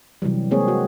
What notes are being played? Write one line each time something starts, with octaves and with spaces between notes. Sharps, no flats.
C3 E3 F#3 G3
G#3 A#3 C4 G#4 A#4 C#5
F#4